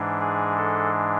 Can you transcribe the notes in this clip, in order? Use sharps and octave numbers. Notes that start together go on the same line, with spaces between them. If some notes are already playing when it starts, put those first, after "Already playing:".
Already playing: G#2 E3 G#3 D4
G#4
A4